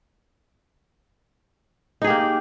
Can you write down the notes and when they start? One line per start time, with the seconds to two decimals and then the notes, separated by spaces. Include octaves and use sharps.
2.02 D#4
2.04 G#4
2.07 G4
2.10 A#3